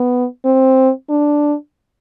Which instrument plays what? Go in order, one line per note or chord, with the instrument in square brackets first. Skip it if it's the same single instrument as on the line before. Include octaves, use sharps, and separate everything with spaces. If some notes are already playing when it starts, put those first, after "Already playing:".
Already playing: [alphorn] B3
C4
D4